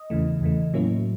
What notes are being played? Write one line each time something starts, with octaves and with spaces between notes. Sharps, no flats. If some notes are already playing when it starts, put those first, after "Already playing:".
Already playing: D#5
E2 C#3 E3 A3
E2 C#3 E3 A3
A2 F#3 A#3 C#4 E4